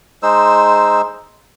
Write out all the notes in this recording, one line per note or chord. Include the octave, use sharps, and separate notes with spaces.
G#3 D#4 C5 E6